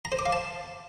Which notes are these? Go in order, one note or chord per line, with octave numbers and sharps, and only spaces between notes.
A#5
C5
D6
F5
A5